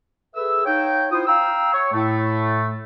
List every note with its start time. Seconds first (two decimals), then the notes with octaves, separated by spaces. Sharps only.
0.36 G#4 A4 B4 E5 E6
0.65 D#4 C#5 F5 G5
1.12 E4 F4 C5 D#6
1.27 F5 G5 A#5 E6
1.74 C#5
1.93 A2 A3